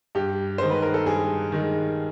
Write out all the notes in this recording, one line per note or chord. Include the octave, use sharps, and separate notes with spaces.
G2 G4
D#3 G#3 C5
B4
A#4
A4
G2 G#4
D#3 G#3